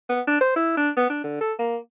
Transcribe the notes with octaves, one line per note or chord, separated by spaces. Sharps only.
B3
D4
C5
E4
D4
B3
D4
D3
A4
A#3